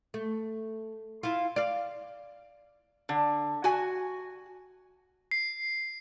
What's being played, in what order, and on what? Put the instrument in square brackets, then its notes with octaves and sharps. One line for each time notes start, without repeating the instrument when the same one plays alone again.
[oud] A3
E4 F4
D5 F5
[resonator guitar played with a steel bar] D3
F#4 G#5
[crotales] C7